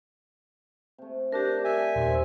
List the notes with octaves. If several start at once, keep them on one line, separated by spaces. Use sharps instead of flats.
C3 A3
D4 G4 A#4 D5
E5 G#5
D#1 D#4 C5